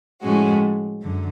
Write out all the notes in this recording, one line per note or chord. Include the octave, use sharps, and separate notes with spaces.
A2 F3 G#3 C#4 F#4
F#2 D3